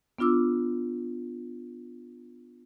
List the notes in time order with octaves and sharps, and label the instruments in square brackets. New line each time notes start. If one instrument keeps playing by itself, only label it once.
[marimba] B3 D4 F4 D6 E6